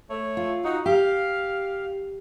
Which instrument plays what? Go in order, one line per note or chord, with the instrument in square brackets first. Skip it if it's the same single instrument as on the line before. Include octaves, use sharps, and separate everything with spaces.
[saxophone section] A3 C#5
[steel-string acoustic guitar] F4
[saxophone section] D#4 F#4
[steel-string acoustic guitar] G4 [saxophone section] F5